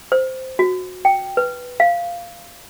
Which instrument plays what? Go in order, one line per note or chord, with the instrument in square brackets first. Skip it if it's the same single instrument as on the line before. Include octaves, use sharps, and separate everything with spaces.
[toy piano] C5
F#4
G5
B4
F5